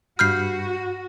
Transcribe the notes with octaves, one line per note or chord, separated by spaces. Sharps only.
G2 F#4 B5 F6 G6 C7